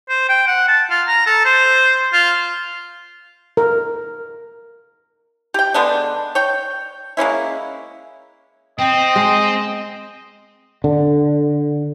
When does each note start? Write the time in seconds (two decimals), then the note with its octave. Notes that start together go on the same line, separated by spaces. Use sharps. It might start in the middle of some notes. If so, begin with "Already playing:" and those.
0.09 C5
0.29 G5
0.47 F#5
0.68 A5
0.90 F4
1.07 A#5
1.26 A4
1.45 C5
2.13 F4
3.57 A#4
5.54 G4 G5
5.74 D3 G#3 B3 D4
6.35 C#5 G5
7.17 G#3 A#3 C#4 E4
8.79 C4 D#5 G5
9.16 G#3
10.84 D3